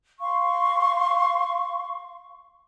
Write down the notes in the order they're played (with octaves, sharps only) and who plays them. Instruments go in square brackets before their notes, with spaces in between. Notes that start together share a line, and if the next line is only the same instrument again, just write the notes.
[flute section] F5 C6 C#6